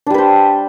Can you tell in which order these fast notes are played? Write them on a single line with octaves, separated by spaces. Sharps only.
D4 G3 B4 C5